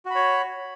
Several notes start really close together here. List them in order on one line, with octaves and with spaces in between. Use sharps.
F#4 B5 C#5